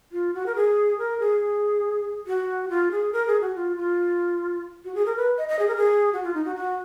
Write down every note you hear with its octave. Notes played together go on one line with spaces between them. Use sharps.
F4
F#4
A#4
G#4
A#4
G#4
F#4
F4
G#4
A#4
G#4
F#4
F4
F4
F#4
G#4
A#4
B4
D#5
D#5
G#4
A#4
G#4
F#4
F4
D#4
F#4
F#4